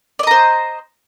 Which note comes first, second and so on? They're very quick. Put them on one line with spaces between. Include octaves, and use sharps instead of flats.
D5 D#5 A#5 C5